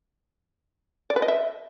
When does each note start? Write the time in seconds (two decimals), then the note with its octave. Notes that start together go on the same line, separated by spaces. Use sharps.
1.10 D5
1.16 B4
1.22 D#5
1.28 E5